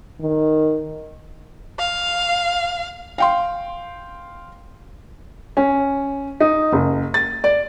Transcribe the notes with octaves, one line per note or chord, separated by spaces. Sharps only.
D#3
F5
F5 G5 C6
C#4
D#4
F#1
A6
D5